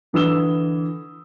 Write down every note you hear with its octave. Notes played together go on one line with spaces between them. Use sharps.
D3 E3 D#6 E6 E7 G7